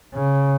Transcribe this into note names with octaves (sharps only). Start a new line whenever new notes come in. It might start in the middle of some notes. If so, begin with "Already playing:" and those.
C#3